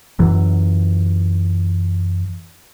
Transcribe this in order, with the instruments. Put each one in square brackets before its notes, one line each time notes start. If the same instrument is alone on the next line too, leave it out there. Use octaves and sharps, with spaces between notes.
[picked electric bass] F#2 E3 F#3